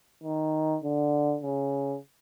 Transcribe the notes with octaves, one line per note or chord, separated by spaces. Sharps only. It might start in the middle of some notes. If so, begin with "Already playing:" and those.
D#3
D3
C#3